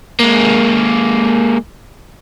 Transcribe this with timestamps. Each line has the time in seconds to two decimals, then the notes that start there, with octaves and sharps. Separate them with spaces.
0.20 G#3 A#3